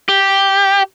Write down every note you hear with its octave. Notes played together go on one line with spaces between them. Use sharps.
G4